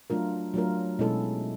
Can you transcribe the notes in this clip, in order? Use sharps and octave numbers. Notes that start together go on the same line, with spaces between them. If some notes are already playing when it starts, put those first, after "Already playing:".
F#3 A3 D4 F4 A#4
F#3 A3 D4 F4 A#4
B2 G#3 C#4 E4 A4